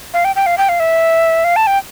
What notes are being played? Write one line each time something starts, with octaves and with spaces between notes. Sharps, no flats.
F5
G5
G5
F5
G5
F5
E5
F5
A5
G5